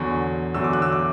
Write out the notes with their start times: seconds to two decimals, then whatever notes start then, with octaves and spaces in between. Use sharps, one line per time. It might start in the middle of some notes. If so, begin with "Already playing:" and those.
Already playing: E2 D3 F#3 C#6
0.54 E2 D3 F#3 E6
0.64 D6
0.73 F#6
0.82 E6
0.92 D6